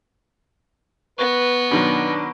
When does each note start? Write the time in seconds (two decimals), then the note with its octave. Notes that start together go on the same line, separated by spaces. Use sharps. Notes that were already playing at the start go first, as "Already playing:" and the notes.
1.19 B3 B4 C#6 A#6
1.71 B2 D#3 F#3 D4 B5 C6 D7